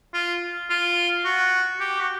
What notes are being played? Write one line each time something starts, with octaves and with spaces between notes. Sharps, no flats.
F4
F4
F#4
G4
F#4